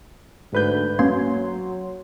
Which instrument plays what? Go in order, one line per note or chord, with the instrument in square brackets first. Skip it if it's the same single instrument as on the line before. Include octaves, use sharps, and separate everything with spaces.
[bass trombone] D2 [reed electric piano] G#2 B4 G6
[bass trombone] F#3 [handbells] A#3 C#4 G#6 [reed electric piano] C6